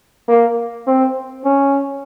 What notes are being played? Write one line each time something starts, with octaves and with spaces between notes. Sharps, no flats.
A#3
C4
C#4